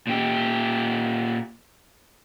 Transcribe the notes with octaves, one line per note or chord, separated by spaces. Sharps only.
A#2 G4